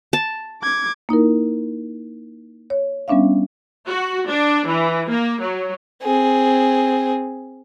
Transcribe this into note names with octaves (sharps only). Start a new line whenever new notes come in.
A5
D6 G#6
A#3 D#4 E4 A#4
C#5
G3 B3 C#4 D4 E5 F5
F#4
D4
E3
A#3
F#3
C4 G#4